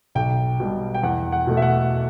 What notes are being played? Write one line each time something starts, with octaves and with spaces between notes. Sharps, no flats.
B1 G5
B2 G3
G5
E2 F#5
F#5
B2 A3
E5
F#5